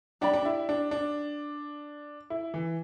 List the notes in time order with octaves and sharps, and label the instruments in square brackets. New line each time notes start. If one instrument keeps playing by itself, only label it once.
[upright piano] D4 [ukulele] G4 D5 G5 B5
[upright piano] D4
E4
D4
D4
E4
E3